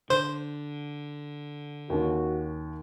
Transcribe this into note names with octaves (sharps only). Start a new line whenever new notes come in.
D3 C5
D#2 C#4 F#4